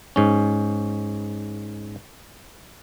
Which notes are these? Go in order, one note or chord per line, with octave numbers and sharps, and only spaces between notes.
G#2 C#4